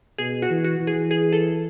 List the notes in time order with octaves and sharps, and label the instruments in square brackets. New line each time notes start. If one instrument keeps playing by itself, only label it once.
[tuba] B2 [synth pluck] G#4
[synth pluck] F#4
[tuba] E3
[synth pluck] F#4
[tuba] E3
[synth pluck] G#4
G#4
A4